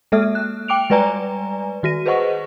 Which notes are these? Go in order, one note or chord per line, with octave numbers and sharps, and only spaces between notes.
G#3 A#3 A4 E5 F6
F#6
G5 D6 D7 F7
G3 G#3 B4 D5 G#5 A#5
D#3 F#4 A#6 D#7
G#4 B4 C5 D#5 F#5 C#6